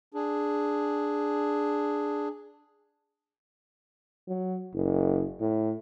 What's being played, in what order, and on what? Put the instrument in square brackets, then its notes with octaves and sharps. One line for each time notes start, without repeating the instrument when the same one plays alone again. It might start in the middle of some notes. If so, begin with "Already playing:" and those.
[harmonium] D4 G#4
[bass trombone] F#3
F#1
A2